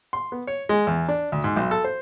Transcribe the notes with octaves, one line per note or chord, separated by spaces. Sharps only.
C6
B3
C#5
G#3
E2
D4
D2
G#2
B1
A4
C5